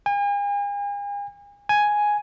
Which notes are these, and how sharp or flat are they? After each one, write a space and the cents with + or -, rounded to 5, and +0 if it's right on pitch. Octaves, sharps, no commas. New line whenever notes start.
G#5 -40
G#5 +5